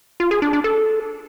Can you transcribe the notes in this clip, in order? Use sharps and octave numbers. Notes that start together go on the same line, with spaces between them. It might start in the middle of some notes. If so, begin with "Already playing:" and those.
F4
G#4
D4
D4
A4